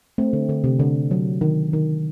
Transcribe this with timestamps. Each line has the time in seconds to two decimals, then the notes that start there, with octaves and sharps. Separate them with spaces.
0.18 A3 C4
0.33 D3
0.49 D3
0.64 C3
0.79 D3
1.11 F#3
1.41 D#3
1.73 D#3